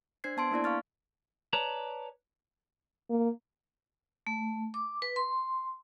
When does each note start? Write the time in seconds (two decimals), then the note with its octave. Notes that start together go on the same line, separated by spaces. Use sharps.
0.24 D4 C5 G#6 C7
0.37 B3 A5 C6 D7
0.51 A#3 D4 E4 D5
0.64 F5 C#6 F6 A6
1.53 B4 C#5 D5 A5 A#5
3.10 A#3
4.27 A3
4.74 D6
5.02 B4
5.16 C6